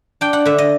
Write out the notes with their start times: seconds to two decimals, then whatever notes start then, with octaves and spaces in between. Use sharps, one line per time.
0.21 D4 G5
0.33 F#5
0.45 D3 E5
0.58 D#5